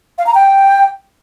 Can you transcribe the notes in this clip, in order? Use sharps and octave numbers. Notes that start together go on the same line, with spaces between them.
F5
A#5
G5